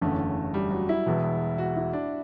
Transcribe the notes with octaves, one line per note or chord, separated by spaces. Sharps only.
F#1 E2 D3 A3 C#4
G3
F#3
E4
E1 E2 B2
F#4
E4
D4